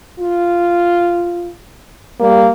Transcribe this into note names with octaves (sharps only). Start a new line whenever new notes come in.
F4
G3 A#3